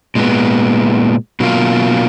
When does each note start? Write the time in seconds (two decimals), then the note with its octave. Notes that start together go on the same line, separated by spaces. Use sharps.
0.15 A#2 G#3 B3
1.40 B2 F#3 A#3 F4